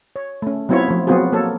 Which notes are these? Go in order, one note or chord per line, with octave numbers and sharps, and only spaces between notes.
C#5
A3 C#4
F#3 B3 C4 E4 F4 C#5
F3 A3
F#3 B3 C4 F4 F#4 G#4
A#3 A4 C#5